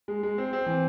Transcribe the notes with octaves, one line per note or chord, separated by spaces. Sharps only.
G#3
G#3
C4
C4
E3